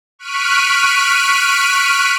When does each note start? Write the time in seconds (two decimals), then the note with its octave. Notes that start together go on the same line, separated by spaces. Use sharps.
0.19 C#6 F6 F#6 B6 D7 D#7